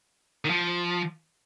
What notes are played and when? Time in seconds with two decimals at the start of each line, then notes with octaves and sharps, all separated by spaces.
0.45 D#3
0.50 F3